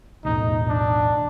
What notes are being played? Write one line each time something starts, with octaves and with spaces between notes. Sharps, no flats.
B1 E2 A2 D#4
D4